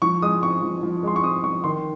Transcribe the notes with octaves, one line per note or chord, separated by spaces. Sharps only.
F3 C#6
G#3 D#6
C4 C#6
F3
F3
G#3 C6
C#6
C4 D#6
F3 C#6
D#3 C6